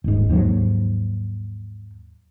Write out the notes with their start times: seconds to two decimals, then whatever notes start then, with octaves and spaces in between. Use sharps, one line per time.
0.04 D#1 G#2
0.29 D#2 G#2 F3 F#3